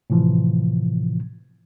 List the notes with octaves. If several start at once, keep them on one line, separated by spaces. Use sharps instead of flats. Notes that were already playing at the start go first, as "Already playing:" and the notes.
A2 C3 E3 F3